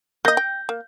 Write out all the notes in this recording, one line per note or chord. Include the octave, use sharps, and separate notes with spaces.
A#3 D#5 G6 A#6
G5
A#3